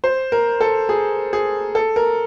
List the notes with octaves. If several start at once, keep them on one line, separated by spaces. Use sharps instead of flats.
C5
A#4
A4
G#4
G#4
A4
A#4